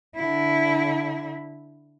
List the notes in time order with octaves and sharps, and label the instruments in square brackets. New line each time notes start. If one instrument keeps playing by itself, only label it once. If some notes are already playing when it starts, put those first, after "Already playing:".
[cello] D3 E4